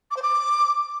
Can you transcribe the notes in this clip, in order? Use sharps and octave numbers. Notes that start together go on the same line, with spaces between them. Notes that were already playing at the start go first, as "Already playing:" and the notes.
D6
C5
D6